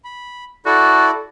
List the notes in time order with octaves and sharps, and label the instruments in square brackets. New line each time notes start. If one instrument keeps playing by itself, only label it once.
[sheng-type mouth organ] B5
[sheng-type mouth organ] E4 A4 D5 [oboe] F#4